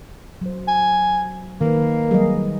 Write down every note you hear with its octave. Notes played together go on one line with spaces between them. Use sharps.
F#3 C5
G#5
D#3 A#3 B4
F#3 G3 G#4 D#5